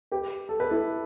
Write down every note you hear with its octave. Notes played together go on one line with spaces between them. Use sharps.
G4 B4
A4
B4
E4 A4